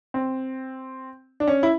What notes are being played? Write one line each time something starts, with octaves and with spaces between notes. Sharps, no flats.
C4
D4
C#4
E4